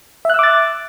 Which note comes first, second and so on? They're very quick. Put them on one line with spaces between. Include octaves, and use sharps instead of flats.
E5 F#6 E6 D6 A6